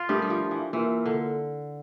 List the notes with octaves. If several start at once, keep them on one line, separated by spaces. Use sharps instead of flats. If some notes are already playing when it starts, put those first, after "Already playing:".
Already playing: F4
G3 A3 D4 G4 A#4
G3
F3
E3
E3 A#3 F4 A#4
D3